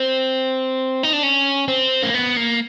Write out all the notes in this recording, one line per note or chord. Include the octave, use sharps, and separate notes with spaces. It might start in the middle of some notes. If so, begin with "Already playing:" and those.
Already playing: C4
D#4
D4
C#4
C4
A#3
B3
A#3